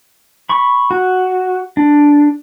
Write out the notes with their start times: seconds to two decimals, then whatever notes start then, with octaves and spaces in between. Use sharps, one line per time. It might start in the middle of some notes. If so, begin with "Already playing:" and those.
0.49 B5 C#6
0.91 F#4
1.77 D4